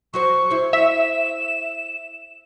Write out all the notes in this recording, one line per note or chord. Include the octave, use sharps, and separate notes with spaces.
F#3 F#4 C5 C#6
E4 C5
E5 E7